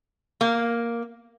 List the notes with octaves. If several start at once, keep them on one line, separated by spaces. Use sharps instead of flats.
A#3